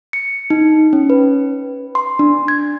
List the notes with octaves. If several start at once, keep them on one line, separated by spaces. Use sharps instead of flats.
C#7
D#4
C#4
B4
C6
D4
G#6